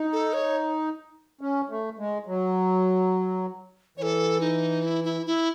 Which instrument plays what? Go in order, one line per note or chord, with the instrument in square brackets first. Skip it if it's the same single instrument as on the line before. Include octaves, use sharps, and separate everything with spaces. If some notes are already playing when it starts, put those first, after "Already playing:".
Already playing: [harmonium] D#4
[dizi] A4
C#5
[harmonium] C#4
A3
G#3
F#3
[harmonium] E3 [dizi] A4 C#5
[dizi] D#4
E4
E4
E4